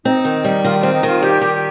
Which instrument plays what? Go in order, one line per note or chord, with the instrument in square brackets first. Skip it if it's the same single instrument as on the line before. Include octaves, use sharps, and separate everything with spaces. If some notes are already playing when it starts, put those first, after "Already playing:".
[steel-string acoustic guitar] C4 [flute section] D#4
[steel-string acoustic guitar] D#3
G3
[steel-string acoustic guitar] D#3 [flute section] F4
[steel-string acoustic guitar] C4 [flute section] F4
[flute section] D#4
[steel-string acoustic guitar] D#3 [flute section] F4
[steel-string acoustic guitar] G3 [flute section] G4
[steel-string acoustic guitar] D#3